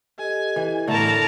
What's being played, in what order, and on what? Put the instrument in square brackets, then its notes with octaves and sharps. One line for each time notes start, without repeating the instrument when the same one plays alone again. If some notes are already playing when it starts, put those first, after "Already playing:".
[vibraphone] G4 A4 D#5 [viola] G#5
[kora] E3
[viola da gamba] A2 E3 A#4 [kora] D3 A3 [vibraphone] B3 [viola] A5 A#5